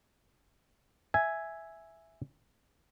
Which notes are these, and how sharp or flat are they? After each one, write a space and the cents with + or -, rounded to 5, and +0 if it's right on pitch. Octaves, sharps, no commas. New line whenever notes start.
E5 +0 G#5 +0